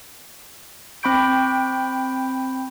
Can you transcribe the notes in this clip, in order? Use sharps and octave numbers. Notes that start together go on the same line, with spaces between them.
C4 G5 B5 C#6 G6 D7